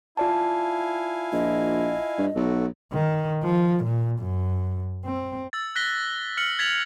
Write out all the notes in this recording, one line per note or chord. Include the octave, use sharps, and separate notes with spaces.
E4 F4 D5 F5 G#5 A5
A#1 D#5
G2
B1 A3 F#4 A4
D#3
F3
A#2
F#2
C4
E6 A6
F#6 A#6 B6 G7
F6 C#7 F#7
G#6 A6 B6 F7 F#7